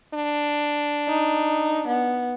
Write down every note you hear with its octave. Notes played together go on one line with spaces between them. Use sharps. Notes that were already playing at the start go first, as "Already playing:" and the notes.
D4
D#4
B3